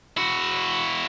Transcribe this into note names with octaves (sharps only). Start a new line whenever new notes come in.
E4 F#4